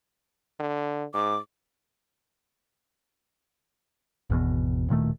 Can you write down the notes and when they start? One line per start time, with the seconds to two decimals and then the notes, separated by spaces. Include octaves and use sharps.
0.59 D3
1.14 G#2 D6
4.30 G#1 E2 B2
4.89 D1 A#2 D#3 A3